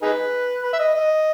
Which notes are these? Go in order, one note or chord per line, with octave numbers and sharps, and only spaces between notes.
D#4 G#4 B4
B4
E5
D#5
D#5